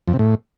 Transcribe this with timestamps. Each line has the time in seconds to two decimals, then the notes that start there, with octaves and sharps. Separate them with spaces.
0.08 F2
0.13 C3
0.19 A2